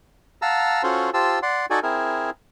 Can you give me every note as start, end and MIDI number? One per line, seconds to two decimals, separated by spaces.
0.42 0.82 77
0.42 0.82 78
0.42 0.82 81
0.42 0.82 82
0.42 0.82 88
0.83 1.10 61
0.83 1.10 65
0.83 1.10 66
0.83 1.10 69
0.83 1.10 72
1.14 1.39 65
1.14 1.39 67
1.14 1.39 72
1.14 1.39 81
1.14 1.39 88
1.43 1.66 74
1.43 1.66 78
1.43 1.66 84
1.70 1.80 63
1.70 1.80 66
1.70 1.80 69
1.70 1.80 74
1.70 1.80 80
1.83 2.30 60
1.83 2.30 64
1.83 2.30 68
1.83 2.30 70